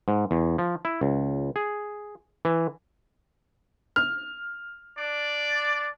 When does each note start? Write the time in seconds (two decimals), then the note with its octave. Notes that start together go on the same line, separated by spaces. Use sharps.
0.08 G#2
0.31 E2
0.58 F3
0.85 E4
1.01 C#2
1.56 G#4
2.45 E3
3.96 F6
4.98 D4 D5